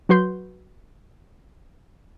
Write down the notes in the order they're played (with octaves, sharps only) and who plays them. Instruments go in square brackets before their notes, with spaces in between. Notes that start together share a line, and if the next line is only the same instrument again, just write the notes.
[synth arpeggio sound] F#3 F#4 B4 C6 G6